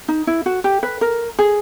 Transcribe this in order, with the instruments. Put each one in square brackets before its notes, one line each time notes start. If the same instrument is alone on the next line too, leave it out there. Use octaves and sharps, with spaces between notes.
[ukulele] D#4
E4
F#4
G4
B4
A#4
G#4